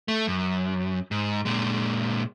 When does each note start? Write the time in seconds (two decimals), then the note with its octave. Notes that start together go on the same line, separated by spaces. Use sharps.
0.08 A3
0.27 F#2
1.11 G#2
1.45 A#2 G#3